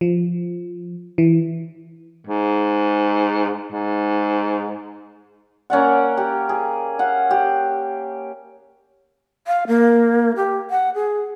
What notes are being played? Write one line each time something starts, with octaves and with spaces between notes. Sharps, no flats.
F3
E3
G#2
G#2
A#3 C#4 D5 F#5
G4
G#4
F5 F#5
G4
F5
A#3
G4
F#5
G#4